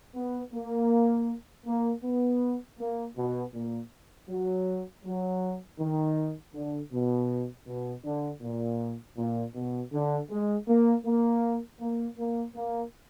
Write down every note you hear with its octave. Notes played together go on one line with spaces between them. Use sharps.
B3
A#3
A#3
B3
A#3
B2
A#2
F#3
F#3
D#3
D3
B2
B2
D3
A#2
A#2
B2
D3
G#3
A#3
A#3
A#3
A#3
A#3